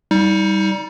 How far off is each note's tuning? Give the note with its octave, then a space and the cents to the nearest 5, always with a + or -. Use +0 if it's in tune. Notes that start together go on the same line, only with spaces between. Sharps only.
G3 -5 D#4 +30